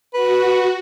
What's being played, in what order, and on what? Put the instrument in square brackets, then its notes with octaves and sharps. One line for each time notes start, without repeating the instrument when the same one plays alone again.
[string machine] F#4 [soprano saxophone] B4